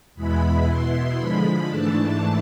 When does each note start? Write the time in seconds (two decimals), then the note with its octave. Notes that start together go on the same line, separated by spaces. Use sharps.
0.15 E2 B2 G#3 B3 E4 B5
0.65 B2 B3 E4 C6
1.16 D3 F3 G#3 B5
1.66 G#2 E3 A3 D4 A5